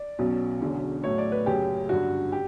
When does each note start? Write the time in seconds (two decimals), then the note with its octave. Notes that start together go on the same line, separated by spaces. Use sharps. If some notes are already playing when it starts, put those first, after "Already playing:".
Already playing: D5
0.19 B1 B2 F#3 C#4
0.61 E1 E2 D3 F#3 C#4
1.04 A2 F#3 A3 C#5
1.18 D5
1.32 B4
1.46 F#1 F#2 C#3 G4
1.89 G2 D3 F#3 F#4
2.32 G4